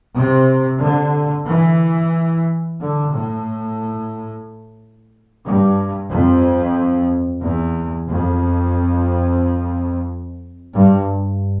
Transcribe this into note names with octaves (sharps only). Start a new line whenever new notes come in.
C3
D3
E3
D3
A2
G2
F2
E2
F2
G2